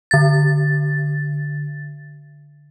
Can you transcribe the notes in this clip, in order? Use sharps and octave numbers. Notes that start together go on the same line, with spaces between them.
D3 A6